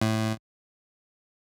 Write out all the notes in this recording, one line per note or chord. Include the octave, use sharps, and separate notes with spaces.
A2